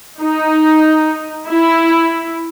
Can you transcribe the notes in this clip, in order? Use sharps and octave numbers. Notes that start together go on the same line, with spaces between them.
D#4
E4